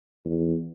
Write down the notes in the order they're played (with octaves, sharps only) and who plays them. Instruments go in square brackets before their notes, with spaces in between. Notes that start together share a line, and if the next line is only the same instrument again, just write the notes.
[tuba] E2